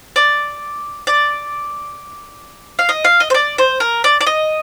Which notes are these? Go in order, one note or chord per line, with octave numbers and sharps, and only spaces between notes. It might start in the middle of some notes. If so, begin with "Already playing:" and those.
D5
D5
F5
D#5
F5
D#5
C5
D5
C5
A#4
D5
D5
D#5